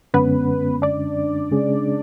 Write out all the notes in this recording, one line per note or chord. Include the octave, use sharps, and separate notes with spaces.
F#2 D3 G#3 B3 C#4 B4
D4 D5
C#3 G#3 C#4 G#4